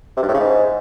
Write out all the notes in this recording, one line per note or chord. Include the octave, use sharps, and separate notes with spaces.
C3
G2
A2
C#3
G#2